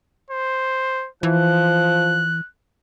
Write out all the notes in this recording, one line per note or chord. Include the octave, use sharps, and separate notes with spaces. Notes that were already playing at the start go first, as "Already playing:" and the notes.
C5
E3 F3 F#6